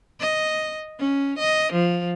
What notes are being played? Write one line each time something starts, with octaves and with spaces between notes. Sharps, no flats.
D#5
C#4
D#5
F3